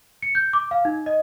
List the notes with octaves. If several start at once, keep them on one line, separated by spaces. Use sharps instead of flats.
C#7
G6
D6
F5
D#4
D#5